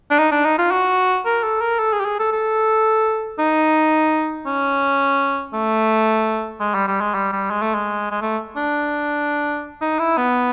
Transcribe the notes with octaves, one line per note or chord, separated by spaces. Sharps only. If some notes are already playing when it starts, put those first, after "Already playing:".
D4
D#4
D4
D#4
F4
F#4
A#4
A4
A#4
A4
G#4
G4
G#4
A4
A4
D#4
C#4
A3
G#3
G3
G3
G#3
G3
G3
G#3
A3
G#3
G#3
A3
D4
D#4
E4
B3